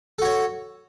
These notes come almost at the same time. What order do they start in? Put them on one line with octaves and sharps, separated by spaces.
A4 F#4 C#5